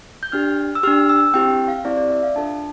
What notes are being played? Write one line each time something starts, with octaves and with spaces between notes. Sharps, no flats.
G6
D4 G4 F6
E6
D4 G4 F6
E6
C4 E4 G4 G5
F5
C4 E4 G4 D5
D5
E5
F5
D4 F4 A4 A5